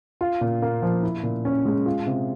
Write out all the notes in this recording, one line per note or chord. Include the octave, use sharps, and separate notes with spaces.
F4
A#2
A#3
F3
E4
A#2
C#4
G#3
F4
C3